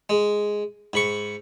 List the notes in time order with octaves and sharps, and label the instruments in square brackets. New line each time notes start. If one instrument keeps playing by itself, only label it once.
[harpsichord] G#3
G#2 B5 C#6